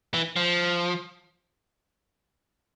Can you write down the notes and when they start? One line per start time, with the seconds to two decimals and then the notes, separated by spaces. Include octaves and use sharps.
0.14 E3
0.36 F3